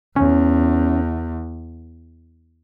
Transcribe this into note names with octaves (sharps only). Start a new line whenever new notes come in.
E2 C#4